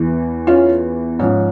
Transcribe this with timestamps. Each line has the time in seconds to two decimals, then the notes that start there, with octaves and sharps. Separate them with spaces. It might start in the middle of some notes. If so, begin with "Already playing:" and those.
Already playing: E2 E3
0.47 C#4 F4
1.19 G#2 F3 C#4